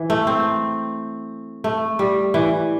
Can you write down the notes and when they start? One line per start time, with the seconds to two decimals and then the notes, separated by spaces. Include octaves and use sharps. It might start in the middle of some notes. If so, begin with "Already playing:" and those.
Already playing: E3
0.10 A3
0.27 C4
1.64 A3
1.99 G3
2.34 E3